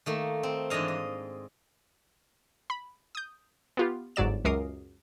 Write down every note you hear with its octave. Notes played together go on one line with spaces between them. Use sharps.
D#3 A3 A#3
C4
G#2 E3 D4 D#5 F5
D#5
B5
D#6 G6
B3 F4 G4
G1 G#2 F#3 D5 E7
C#2 F#2 A#4 D6 D#6 C7